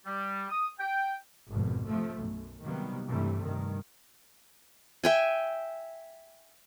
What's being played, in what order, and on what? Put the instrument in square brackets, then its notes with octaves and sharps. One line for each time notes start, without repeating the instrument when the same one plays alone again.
[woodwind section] G3
D#6
G5
[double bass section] G#1 F2 B2
C3 F3 A3
B1 F#2
C3 D#3 F#3 G3 A#3 B3
G2 C3 E3 G3 A3
G2 D#3
[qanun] E5 G5 G#5